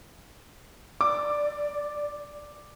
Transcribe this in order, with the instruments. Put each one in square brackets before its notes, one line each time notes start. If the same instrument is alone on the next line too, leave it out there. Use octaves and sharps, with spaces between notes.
[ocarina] D5 [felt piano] D6